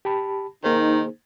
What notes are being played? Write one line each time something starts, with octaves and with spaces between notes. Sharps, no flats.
G4 A5 B5
D#3 A#3 D#4 G#4 C5